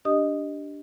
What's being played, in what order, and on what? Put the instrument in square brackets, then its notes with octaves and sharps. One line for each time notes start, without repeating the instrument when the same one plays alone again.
[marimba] D4 G4 D#5 D#6